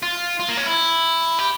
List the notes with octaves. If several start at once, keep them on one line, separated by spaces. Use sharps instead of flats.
F4
F4
A#3
C#4
E4
G4